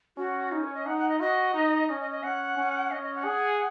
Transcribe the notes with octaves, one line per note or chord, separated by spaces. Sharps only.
C#4 F#4
D#4
C#5
D#5
D#4 F#5
F#5
D#5
F#4 D#5
D#4
C#4 D#5
D#5
D#5
C#4 F#5
C#4
C#4 D#5
D#5
F#5
G#4